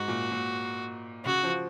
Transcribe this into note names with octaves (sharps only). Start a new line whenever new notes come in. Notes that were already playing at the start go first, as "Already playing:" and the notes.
Already playing: G#2 F#4
A#2
A#2
C#3 F#4
F3